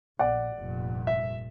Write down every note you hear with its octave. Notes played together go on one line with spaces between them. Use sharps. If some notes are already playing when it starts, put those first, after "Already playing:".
A#1 D5 F#5
F1 G2 A#2
E5